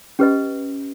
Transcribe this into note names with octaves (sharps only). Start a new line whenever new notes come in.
C#4 G4 B4 D#5